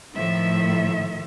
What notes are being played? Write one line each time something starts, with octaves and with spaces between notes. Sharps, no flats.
A2 D#3 F3 E5